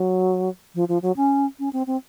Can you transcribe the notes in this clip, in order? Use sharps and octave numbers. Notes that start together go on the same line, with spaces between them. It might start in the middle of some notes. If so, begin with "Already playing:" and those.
Already playing: F#3
F3
F3
F#3
C#4
C#4
C4
C4